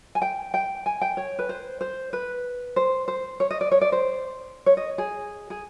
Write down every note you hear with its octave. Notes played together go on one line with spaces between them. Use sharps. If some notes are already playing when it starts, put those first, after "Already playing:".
G#5
G5
G5
G#5
G5
C#5
B4
C5
C5
B4
C5
C5
C#5
D#5
D5
C#5
D5
C5
C#5
D#5
G#4
G#4